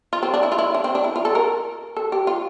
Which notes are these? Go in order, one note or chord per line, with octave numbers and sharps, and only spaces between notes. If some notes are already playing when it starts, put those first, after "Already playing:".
F4
C4
D4
E4
F4
E4
D4
C4
D4
E4
F4
A4
A#4
A4
G4
F4